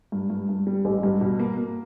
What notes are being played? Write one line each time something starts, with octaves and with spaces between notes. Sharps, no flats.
G2
G2
G2
G3
A1
G2
B2
A#3
A#3